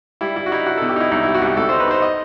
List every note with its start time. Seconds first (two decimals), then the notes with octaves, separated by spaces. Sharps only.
0.21 G3 E4
0.36 G3 E4
0.46 F#4
0.52 D#4 E4
0.66 D#4 F#4
0.78 B2 A4
0.89 G4
0.96 D#4 E4
1.12 C2 D#4
1.23 G3 E4
1.35 F#4
1.42 C2 G4
1.57 C2 A4
1.69 D#4 C5
1.80 B4
1.88 D#4 C5
2.02 D#5